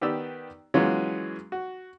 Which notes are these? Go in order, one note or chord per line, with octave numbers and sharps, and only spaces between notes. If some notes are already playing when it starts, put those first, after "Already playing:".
D#3 B3 G4 D5 E6
E3 F#3 G#3 B3 C#4 F4
F#4